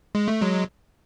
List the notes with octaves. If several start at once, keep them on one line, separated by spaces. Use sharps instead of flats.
G#3
A3
F#3 G#3